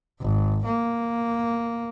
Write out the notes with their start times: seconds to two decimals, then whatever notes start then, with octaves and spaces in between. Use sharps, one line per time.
0.21 G#1
0.65 A#3